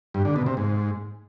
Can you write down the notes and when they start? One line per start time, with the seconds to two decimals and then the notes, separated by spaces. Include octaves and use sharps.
0.14 G2
0.25 D3
0.36 B2
0.46 C3
0.57 G#2